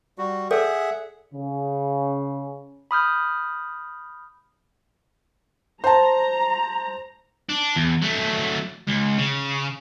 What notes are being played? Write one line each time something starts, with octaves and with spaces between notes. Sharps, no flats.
G3 F#4
G#4 A4 D5 E5 F#5
C#3
B5 D#6 F6 G6
C5 A5 A#5
D4
E2
F#3 A3
C#2
C#3